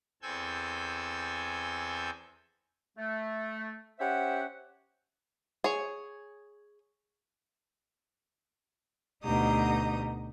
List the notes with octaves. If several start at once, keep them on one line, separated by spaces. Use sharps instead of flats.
E2 C4 A4 G#5 E6 G6
A3
C#4 G4 C5 E5 F#5
G#4 C#5
D2 B2 D#4 G4 A#5 D#6